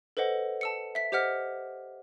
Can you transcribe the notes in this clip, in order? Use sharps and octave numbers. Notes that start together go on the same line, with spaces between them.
A4 B4 C5 D#5 F#5
A5 E6 C#7
E5 B6
G4 C5 D#5 F#5 F6 B6